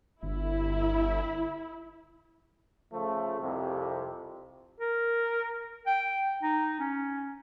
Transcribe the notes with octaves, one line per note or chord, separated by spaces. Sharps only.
G1 E4
C#3 F3 A3
C2 F2 C3
A#4
G5
D#4
C#4